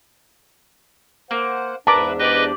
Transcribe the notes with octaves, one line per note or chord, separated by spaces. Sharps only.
A#3 C5 F#5
E2 G#2 D4 A#4 B4 E5 A5 D6
G4 B4 D5 D#5